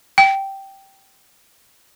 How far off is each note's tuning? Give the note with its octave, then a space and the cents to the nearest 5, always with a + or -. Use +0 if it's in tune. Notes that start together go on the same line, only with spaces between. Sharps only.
G5 -10